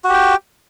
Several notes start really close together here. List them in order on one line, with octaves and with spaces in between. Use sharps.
F#4 G4 G5